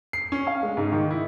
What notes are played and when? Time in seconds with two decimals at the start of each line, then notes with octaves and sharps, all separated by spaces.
0.13 C7
0.32 C#4
0.47 F5
0.63 G#3
0.77 G#2
0.92 D#3
1.11 E4